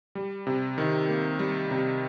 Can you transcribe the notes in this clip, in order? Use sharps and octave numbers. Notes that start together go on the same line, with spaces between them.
G3
C3
D#3
A#3
G3
C3